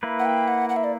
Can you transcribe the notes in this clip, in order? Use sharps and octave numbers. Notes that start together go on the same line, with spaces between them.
A#3 E4 B4
F#5
G5
F#5
F#5
E5
D5